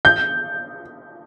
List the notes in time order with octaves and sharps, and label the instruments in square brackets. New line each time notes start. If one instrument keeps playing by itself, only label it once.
[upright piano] G6